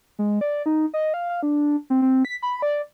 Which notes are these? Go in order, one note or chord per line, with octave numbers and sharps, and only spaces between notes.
G#3
D5
D#4
D#5
F5
F5
D4
C4
C4
B6
B5
D5